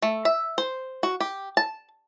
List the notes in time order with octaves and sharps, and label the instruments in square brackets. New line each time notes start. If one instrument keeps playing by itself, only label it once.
[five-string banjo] A3
E5
C5
F#4
G4
A5